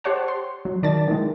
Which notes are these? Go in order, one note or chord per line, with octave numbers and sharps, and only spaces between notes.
G4 C5 C#5 F#5 A5
C6
F#3
D#3 D5 A5 A6
D#3 E3 G#3